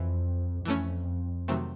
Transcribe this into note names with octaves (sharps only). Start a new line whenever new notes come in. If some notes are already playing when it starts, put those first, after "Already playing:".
Already playing: F2 E3
F2 E3 A3 C#4
C3 D#3 F#3 A3 C4